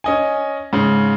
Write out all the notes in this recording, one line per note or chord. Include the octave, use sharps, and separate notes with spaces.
C#4 D#5 G#5
G#2 C#3